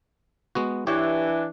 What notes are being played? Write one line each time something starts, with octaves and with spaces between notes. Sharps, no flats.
G#3 B3 F#4
E3 D4 G4 C#5